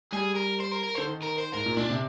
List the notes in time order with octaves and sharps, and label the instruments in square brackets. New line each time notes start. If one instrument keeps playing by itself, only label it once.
[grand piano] G3 [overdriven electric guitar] G#4
[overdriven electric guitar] A#4
C5
A#4
A#4
[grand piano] D3 [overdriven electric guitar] C5
[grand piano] D#3
[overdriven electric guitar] A#4
C5
[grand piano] G#2 [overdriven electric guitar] A#4
[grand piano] A#2
[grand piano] A#2 [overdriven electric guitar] D4
[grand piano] C3